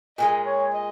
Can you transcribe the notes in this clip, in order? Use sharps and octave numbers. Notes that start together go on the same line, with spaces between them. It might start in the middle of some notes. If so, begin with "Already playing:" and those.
A#2 F3 G#3 D#5
C#5
D#5